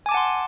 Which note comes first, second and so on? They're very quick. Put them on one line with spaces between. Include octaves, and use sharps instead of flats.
G#5 D6 A5 F#5 C6